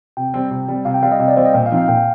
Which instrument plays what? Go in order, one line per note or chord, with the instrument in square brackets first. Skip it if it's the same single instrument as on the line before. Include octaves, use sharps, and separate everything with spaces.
[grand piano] C3 [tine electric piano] G5
[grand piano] G3 C4
C3
G3 C4
[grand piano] C3 [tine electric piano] F5
[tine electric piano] G5
[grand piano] G3 C4 [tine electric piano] F5
[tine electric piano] D#5
[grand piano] C3
[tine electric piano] D5
[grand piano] G3 C4 [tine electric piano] C5
[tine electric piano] D#5
[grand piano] A#2 [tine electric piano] G5
[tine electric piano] F5
[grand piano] F3 C4 D#4
[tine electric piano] F5
[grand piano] A#2 [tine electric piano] G5